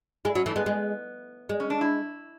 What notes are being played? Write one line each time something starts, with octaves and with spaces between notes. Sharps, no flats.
G#3 E4
F#3 C#4
E3 A3
G#3 B3
G#3
G#3
C#4
D4
E4